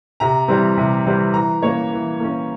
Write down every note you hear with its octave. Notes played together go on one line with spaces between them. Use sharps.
C3 A#5
E3 G3 C4
C3
E3 G3 C4
E3 A#5
A#3 C#4 C#5
E3
A#3 C#4